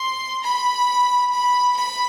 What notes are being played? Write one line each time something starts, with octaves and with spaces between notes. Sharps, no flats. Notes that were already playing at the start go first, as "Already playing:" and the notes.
Already playing: C6
B5
B5
B5